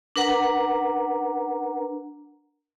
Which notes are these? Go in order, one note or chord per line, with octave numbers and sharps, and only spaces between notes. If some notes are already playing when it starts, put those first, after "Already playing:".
D4 A#4 B4 F#5 A#5